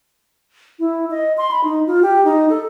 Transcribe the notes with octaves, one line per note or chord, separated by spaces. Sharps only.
E4
D#5
C6
B5
D#4
F4
G4
D#4
A4